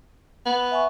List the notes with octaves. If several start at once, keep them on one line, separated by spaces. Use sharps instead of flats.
B3
E5 G#5 C#6